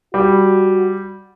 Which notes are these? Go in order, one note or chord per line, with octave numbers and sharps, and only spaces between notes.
G3 F#4